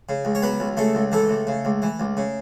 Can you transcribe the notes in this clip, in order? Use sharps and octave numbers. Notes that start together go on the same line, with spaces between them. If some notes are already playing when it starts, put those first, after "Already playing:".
C#3
C#2
C#5
F#3 B3 B4
C#2
C#3 A3 A4
C#2
E3 A3 A4
C#2
C#3
C#2
E3
C#2
C#3